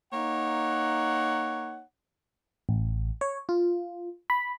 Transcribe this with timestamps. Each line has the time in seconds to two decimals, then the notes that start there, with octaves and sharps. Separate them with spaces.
0.12 A#3 D#4 C#5 F#5
2.69 A1
3.21 C#5
3.49 F4
4.30 B5